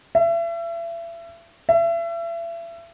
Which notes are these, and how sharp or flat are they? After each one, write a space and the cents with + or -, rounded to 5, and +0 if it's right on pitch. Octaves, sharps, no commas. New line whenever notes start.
E5 +35
E5 +35